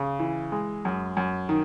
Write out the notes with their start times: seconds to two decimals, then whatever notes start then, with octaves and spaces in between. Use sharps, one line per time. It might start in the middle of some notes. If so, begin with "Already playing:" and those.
Already playing: C#3
0.19 E3
0.52 G#3
0.85 F#2
1.17 F#2
1.49 D#3